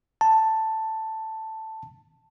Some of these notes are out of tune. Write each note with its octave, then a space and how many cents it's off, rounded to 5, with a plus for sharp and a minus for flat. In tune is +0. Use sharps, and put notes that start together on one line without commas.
A5 +5